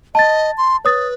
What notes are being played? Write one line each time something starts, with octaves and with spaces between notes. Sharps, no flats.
D#5 A5 A6
C6
B4 C#5 D#6 A6